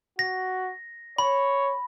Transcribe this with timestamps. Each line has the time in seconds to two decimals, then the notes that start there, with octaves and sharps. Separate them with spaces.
0.19 F#4 A#6
1.18 C#5 B5